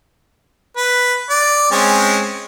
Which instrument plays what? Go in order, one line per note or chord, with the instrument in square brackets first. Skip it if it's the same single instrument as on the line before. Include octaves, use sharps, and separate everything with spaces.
[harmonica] B4
D5
G#3 C4 C#4